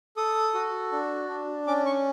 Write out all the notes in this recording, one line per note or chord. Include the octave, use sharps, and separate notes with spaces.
A4 D#6
F#4
D4
D4
C#4 D6
C#6